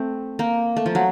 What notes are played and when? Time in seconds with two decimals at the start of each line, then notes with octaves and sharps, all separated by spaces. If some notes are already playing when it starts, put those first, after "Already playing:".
Already playing: A3 C4
0.39 A#3
0.76 A3
0.86 F3
0.95 F#3